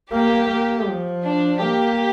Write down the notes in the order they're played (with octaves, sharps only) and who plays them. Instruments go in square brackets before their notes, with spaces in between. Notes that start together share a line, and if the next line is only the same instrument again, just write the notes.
[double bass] A#3 [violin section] G4
[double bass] A#3
F3
[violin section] D4
[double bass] A#3 [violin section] G4